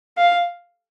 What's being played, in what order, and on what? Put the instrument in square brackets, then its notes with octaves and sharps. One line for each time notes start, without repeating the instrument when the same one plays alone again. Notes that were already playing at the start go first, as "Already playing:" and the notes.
[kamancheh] F5